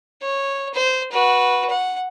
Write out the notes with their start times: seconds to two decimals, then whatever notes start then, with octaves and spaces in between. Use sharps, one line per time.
0.22 C#5
0.74 C5
1.11 F#4 B4
1.70 F#5